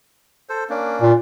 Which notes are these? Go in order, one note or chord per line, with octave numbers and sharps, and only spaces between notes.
A4 C5
A#3 C#4 D4
A#2